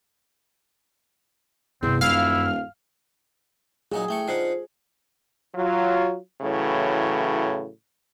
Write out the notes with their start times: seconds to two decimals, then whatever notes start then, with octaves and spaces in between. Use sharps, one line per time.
1.83 G1 E2 C3 C4
2.01 D#1 F#2 E4 F5 F6
3.92 A#2 F#3 D#4 G#4
4.08 A1 A3 G5 C#6
4.28 D3 D#4 F4 C5 F#5
5.55 F#3 F4
6.42 A2 C#3 E3 F#3